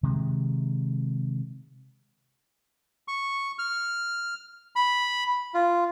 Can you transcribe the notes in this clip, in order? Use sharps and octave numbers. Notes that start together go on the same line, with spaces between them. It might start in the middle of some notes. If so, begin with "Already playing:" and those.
C3 D#3 G#3
C#6
F6
B5
F4